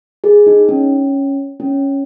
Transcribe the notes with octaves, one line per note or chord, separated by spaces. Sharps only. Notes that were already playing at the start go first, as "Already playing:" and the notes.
G#4
D#4
C#4
C#4